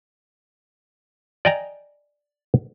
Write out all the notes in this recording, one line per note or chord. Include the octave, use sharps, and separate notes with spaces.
D5 D#5 G5 G#5 A#5